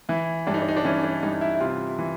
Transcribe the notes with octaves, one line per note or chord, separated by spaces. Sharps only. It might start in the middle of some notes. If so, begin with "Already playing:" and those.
E3 E4
G2 D4
D#4
D4
D#4
D4
E3 C#4
D4
G2 D#4
D#4
E4
E4
C3 F4
E3